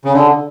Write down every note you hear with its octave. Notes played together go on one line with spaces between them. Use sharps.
C#3
D3